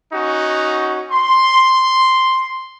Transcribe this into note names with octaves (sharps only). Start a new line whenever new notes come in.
C#4 D#4 F#4
C6